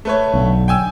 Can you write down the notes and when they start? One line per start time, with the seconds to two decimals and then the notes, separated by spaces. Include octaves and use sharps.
0.05 A3 B4 C#5
0.34 B1 D3
0.68 G5 G#5 E6